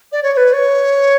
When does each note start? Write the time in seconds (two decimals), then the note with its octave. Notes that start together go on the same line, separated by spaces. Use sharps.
0.12 D5
0.23 C#5
0.33 C#5
0.37 B4
0.53 C#5